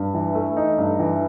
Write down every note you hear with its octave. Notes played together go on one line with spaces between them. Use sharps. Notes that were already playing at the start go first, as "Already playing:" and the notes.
Already playing: G2
E3
A3
D#4
G2
E3